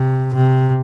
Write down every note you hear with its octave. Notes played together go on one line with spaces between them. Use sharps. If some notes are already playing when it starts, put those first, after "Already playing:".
Already playing: C3
C3